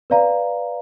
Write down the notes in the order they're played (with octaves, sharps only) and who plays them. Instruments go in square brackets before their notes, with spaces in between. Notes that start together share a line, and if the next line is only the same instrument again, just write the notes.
[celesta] B4 D5 F5 A#5